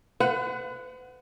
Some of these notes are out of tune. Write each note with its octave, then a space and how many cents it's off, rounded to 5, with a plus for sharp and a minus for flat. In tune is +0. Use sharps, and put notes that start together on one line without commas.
B4 +45 F#5 +0